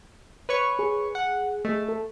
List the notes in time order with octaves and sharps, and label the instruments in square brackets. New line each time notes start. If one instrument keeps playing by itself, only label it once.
[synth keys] B4 C#5 C#6
[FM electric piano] G#4
[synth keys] F#5
[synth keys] A3 [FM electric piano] G#4 D#5
[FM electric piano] A4